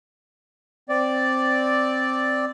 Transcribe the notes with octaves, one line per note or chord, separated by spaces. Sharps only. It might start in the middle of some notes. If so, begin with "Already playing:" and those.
C4 D5